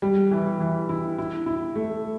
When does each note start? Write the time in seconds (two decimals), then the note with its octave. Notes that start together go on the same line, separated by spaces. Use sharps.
0.02 G3
0.31 E3
0.60 E3
0.89 E4
1.18 E4
1.46 E4
1.75 A3